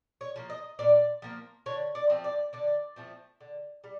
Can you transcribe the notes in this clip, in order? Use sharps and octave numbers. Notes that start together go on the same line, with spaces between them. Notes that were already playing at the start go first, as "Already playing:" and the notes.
C#5
F3 A#3
D#5
A#2 D5
F3 A#3
D3 C#5
D5
F3 A3 C4
D5
D3 D5
F3 A3 C4
D3
G3